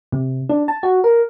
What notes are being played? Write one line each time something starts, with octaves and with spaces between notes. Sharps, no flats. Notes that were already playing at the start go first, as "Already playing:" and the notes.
C3
D4
A5
F#4
A#4